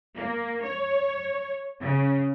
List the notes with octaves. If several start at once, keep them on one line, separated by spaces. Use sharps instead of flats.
A#3
C#5
C#3